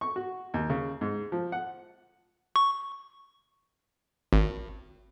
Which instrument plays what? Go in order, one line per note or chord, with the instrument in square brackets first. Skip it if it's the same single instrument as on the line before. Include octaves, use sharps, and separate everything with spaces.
[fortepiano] C#6
F#4
D#2
C#3
G#2
F3
F#5
[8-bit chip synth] C#6
G#1